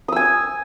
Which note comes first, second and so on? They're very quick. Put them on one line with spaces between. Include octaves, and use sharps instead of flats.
D#6 E6 G#5